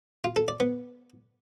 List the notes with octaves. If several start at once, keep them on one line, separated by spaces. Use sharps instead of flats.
F4
A4
D5
B3